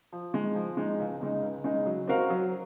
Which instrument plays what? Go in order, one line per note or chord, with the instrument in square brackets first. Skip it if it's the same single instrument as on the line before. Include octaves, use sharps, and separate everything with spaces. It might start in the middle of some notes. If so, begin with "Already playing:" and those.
[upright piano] F3
G#3 D#4
F3
G#3 D#4
C#2
C#3 G#3 D#4
C#2
C#3 G#3 D#4
F#3
C4 F#4 A#4 F5
F#3